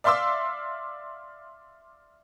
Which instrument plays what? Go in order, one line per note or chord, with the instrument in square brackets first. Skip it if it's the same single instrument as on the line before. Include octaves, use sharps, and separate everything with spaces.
[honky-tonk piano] D5 E5 F5 C6 D6 E6